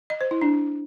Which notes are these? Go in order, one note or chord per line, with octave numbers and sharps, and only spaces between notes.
D#5
C5
E4
D4